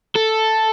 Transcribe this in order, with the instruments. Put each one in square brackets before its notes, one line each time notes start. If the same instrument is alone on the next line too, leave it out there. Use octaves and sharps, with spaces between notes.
[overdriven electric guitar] A4